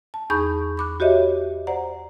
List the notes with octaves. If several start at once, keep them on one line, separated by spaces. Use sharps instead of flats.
A5
E2 D#4 G#4 B5 C#6 G6
B5 D6 F#6
F#4 G4 C#5 D#5 E5
C5 D5 F#5 A#5